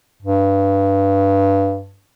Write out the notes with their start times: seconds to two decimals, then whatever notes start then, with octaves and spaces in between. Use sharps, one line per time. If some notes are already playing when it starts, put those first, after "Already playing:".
0.22 G2